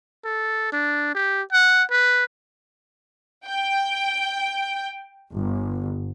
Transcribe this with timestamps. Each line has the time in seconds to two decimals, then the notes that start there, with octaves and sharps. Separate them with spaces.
0.24 A4
0.72 D4
1.15 G4
1.52 F#5
1.91 B4
3.46 G5
5.33 G1